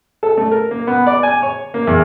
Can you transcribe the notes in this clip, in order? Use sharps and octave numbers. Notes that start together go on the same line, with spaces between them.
A4
A3
A#4
A#3
B3
D5
G#5
C#5
A#3
E2